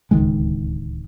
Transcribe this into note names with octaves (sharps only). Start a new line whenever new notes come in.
D1 C#2 D#3 G#3